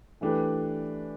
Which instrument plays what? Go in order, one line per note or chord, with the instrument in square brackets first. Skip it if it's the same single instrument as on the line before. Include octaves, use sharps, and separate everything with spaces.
[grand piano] E3 A3 D4 G4 B4